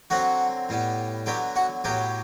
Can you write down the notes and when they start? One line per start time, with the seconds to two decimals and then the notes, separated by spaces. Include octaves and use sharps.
0.10 D3 F#3 C4 F#4 F#5
0.69 A2 G3 B3
1.26 D3 F#3 B3 G4 G5
1.56 F#4 F#5
1.84 A2 F#3 B3 G4 G5